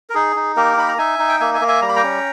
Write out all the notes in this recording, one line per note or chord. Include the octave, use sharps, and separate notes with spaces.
A#4
D#4 G#4
D#4
A#3 G4 A#4
D#4 B5
A#5
D#4 E5 G#5
D#4
G5
A#3 E5 G#5
E5 G#5
A#3
E5 G#5
G3 A#5
B5
G5 A#5
C#4